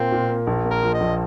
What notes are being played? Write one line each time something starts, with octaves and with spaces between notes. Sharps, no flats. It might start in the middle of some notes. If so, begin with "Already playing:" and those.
Already playing: A#2 A#3 C4
A#2
A#3
A#1
A#3
A#4
F3
D#5
A#1